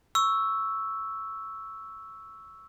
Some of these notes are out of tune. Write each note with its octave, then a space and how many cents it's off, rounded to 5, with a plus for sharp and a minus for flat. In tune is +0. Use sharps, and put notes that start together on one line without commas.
C#6 +5 E6 +0